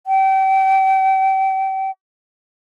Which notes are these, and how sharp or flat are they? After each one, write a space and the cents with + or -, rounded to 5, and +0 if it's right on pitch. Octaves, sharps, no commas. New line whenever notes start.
G5 -35